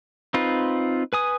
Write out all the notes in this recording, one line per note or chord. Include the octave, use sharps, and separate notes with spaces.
C4 D#4 F4 B4
B4 G#5 D#6